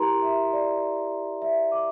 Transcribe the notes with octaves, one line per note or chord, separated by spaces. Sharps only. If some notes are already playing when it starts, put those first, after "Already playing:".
Already playing: E4 G4 A#4 A#5 C6
E5
D5
E5
D6